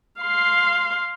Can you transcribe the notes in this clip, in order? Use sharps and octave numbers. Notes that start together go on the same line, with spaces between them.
F5 C6